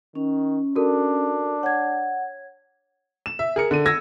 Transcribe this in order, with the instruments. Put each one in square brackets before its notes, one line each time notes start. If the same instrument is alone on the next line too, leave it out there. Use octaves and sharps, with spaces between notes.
[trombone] D#3 [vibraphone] C#4
[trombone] D4 [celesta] F#4 A4 A#4
[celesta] C#5 G#6 [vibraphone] F#5
[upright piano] E7
E5
G#4 A#4 C#7
D3 D#7
E6 G#6 A#6